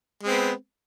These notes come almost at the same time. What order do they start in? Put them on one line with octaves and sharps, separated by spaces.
G#3 C4 B3